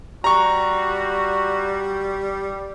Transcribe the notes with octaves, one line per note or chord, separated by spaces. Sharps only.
G3 F#4 A#5 C#6